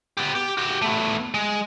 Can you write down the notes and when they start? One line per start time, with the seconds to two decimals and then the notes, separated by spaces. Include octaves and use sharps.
0.17 B3 G4
0.35 G4
0.57 F#4 G4
0.82 A3 B3
1.34 G#3